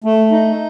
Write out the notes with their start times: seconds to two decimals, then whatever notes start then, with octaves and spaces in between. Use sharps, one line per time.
0.04 A3
0.32 D#4